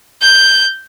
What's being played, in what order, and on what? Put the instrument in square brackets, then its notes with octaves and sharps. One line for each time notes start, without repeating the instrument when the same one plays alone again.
[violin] G6